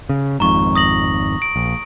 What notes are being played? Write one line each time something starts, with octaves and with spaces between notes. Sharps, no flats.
C#3
G#1 F2 G#2 A#5 C#6
D#6 A#6 F#7
D7
A#1